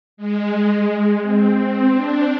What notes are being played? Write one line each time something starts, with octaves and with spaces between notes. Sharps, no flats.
G#3
C4
C4
D4